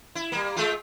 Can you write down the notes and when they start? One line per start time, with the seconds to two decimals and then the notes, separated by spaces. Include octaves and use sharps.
0.15 E4
0.32 G3 A#3
0.56 G#3 A3 F4